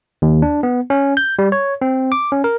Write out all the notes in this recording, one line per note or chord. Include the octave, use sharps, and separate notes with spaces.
D#2
D4
B3
C#4
G6
G3
C#5
C4
D6
C#4
A#4